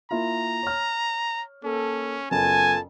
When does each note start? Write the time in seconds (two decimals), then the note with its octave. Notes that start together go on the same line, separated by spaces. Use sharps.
0.11 A#3 E4 F4 A#5
0.63 C#5 F6
1.64 A#3 C#4 A4
2.31 F#1 B3 F4 A4 G#5 A5